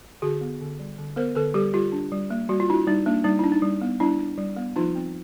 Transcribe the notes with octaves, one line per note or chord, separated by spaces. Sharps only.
D3 F#4 G#4
B3
D3
G3
D3
B3 A#4 C5
D3 A4 B4
G3 G4 A4
G3 F4 G4
D4
G3
A#3
G3 F#4
F4
D4 E4 F#4
G3 D#4
A#3 D4
G3 D#4
D4 E4
D#4
G3
B3
G3 D4 E4
D4
G3
B3
F3 D#4 F4
C4